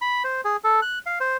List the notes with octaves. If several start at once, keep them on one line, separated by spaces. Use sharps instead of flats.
B5
C5
G#4
A4
F#6
F5
C5